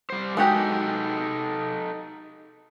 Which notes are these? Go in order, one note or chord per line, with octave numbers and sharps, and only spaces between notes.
G3 C5
G#3 D#4 F#4 G4 A4